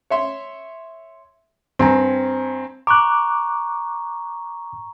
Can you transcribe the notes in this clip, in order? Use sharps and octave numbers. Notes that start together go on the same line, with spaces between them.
C#5 E5 C6
G2 C4 G#5 A#5
A#5 C#6 D6 F#6